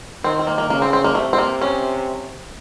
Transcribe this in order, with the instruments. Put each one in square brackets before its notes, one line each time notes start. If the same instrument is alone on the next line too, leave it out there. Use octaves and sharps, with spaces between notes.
[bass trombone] D#3 [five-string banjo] C4
[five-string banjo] C4
A#3
A#3
[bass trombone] C#3 [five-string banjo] A#3
[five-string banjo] C4
C4
A#3
[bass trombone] C3 [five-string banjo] A3
[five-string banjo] C4
A#3
C#4